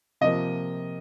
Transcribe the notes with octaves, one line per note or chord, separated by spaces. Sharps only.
C3 F3 A#3 D#5